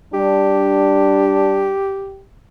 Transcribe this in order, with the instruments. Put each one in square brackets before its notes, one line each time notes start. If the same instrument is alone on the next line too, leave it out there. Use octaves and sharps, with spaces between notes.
[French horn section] G3 D4 [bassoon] G4